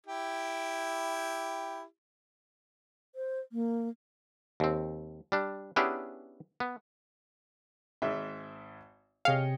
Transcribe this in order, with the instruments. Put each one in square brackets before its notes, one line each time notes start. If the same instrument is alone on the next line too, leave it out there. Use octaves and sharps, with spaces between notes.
[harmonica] E4 G4
[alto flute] C5
A#3
[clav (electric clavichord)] D#2 C4
G3 D4
B3 C#4 D4 E4 G4 G#4
B3
[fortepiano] G#1 G#2 E5
[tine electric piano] C3 G5 C#7 [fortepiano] G#4 C#5 D#5 [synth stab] F5